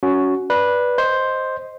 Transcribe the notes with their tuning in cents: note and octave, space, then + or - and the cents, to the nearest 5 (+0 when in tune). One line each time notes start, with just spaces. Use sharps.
C#4 +15 F#4 +0
B4 -10 D5 +0
C5 +0 D#5 +0